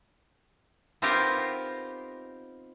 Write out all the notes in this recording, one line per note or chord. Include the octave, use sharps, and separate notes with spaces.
B3 C4 D#4 F4 G4 A#4